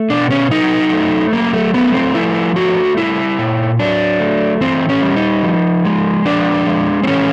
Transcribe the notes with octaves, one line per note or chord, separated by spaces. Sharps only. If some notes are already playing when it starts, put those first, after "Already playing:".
Already playing: A3
B2 D4
C#4
F#3 D#4
A3
F#3 A#3
A3
A3 B3
C4
F3 E4
A3 F#4
G3 E4
A#2
F#3 D4
A3
E3 C4
C#4
G3
D#4
F3
G#3
F3 D4
G#3
C4
E3 C#4